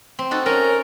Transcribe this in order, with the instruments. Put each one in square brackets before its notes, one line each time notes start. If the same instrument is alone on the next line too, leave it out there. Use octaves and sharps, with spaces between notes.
[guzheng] C4
D#4 F#4 A4
[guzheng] C#4 [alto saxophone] A#4